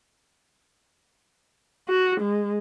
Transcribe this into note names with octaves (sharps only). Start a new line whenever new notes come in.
F#4
G#3